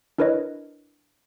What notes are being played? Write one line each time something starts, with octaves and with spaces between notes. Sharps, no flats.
D4 E4 A#4 B4 C#5 D#5